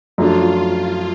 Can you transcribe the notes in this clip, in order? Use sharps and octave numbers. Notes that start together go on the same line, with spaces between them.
F#2 F3 A3 D4 F4